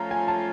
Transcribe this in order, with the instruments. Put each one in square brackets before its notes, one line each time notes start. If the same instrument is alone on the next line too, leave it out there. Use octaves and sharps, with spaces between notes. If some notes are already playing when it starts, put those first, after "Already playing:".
Already playing: [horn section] F3 A3 C#4 F4 [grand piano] A#5
[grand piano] G#5
A5